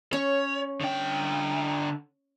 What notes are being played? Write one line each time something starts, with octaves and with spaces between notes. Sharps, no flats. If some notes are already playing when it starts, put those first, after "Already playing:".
C#4 C#5
D3 G5